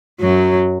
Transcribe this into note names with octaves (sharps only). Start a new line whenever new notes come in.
F#2 F#3